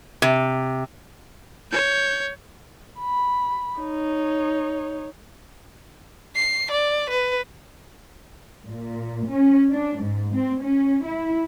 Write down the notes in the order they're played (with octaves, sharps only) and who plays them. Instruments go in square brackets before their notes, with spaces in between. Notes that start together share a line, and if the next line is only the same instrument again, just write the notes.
[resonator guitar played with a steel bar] C3
[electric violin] C#5 G6
[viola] B5
D#4 C#5
[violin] C7
D5
B4
[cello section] A#2
C#4
D4
G#2
C4
C#4
E4